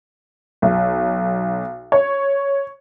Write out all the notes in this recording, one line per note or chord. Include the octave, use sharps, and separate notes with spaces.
B1
C#5